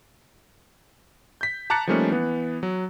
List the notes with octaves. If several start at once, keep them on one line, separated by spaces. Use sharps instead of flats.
G6 B6
A5 A#5 D6 F#6 A6 C#7
F3 G3 A3 A#3 C#4 D#4
E3 B3
F#3